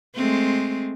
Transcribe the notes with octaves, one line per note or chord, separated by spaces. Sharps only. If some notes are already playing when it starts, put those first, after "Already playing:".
G#3 A3 C4